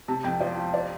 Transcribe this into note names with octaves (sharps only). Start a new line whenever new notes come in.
C3 A5
F2 G5
F3 D5
F3
D5